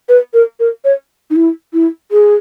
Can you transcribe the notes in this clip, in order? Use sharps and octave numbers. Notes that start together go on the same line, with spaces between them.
B4
A#4
A#4
C#5
D#4
E4
E4
G#4